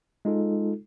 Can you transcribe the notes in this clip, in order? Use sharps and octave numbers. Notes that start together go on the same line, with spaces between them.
G#3 D#4 F4 A4